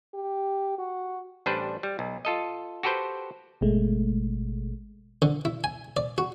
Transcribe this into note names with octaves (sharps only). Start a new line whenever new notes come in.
G4
F#4
A1 G3 D4 B4 C5
G3
B1
F4 A4 D#5
F#4 G4 A4 B4 C5 G5
G#1 B2 G#3 A3
D3
E4
G#5
D5
F#4